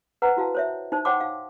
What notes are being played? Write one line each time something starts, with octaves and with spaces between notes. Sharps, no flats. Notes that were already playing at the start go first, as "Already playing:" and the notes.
B4 C5 F#5 A#5
E4 F#4 F5 A5
C5 C#5 E5
D#4 C5 A5
C5 C#5 F#5 G5 C6 D6
F5